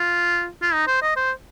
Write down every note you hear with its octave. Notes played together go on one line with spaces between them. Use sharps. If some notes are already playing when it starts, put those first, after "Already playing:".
Already playing: F4
F4
D#4
C5
D#5
C5